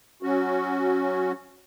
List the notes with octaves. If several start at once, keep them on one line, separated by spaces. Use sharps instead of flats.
F#3 C#4 F#4